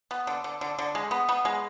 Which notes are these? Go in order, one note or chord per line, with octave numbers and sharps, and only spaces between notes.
B3
D3
D3
D3
D3
G#3
B3
B3
G#3